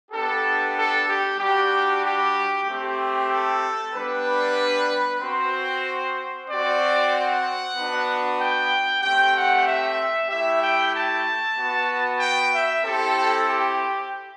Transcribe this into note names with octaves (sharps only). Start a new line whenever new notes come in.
B3 D4 G4 A4
A4
G4
G3 D4 F#4 G4
G4
A3 C4 G4
A4
G3 B3 D4 B4
C4 F#4 C5
C4 F#4 D5
F#5
B3 D4 F#4
G5
A3 C4 G4 G5
F#5
E5
A3 E4 G4 E5
G5
A5
B3 F#4
G5
E5
C4 E4 G4 A4
G4